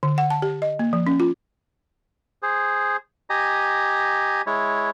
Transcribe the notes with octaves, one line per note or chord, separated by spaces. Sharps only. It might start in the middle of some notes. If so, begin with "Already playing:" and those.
D3
F#5
A5
G4
D#5
A#3
F3
C#4
F4
G#4 C5
G4 D#5 G#5 A#5
G#3 E4 C#5